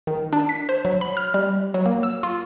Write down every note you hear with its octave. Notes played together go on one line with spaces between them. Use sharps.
D#3
D4
B6
C5
F#3
B5
F6
G3
F#3
A#3
E6
F4